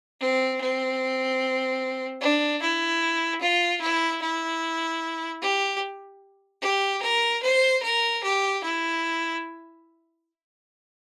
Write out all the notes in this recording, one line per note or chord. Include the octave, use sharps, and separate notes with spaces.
C4
C4
D4
E4
F4
E4
E4
G4
G4
A#4
C5
A#4
G4
E4